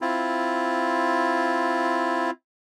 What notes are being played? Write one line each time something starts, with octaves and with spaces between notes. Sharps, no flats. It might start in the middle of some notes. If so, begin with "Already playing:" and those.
C4 E4 F4